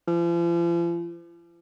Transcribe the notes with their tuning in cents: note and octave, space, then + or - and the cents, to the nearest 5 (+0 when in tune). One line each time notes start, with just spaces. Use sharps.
F3 -40